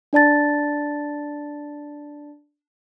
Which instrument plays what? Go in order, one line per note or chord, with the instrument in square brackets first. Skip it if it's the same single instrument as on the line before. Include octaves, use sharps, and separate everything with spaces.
[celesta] D4 D5 A5 A6